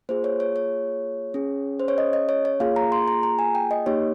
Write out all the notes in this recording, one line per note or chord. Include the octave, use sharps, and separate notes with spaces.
A#3 F4 G#4 C5
C#5
C#5
C#5
C#4 G#4
C5
C#5
D#5
D#5
C#5
C#5
A#3 F4 G#4 F5
A#5
C6
A#5
A#5
G#5
G5
D#5
A#3 D#4 G4 C#5